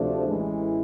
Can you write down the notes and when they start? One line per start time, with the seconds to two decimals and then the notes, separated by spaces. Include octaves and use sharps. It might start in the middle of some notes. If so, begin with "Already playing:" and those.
Already playing: D2 C3 F3 A3 D4
0.27 A1 A2 E3 G#3